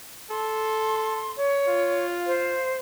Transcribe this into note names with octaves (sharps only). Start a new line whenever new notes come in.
A4 C6
C#5
F4
C5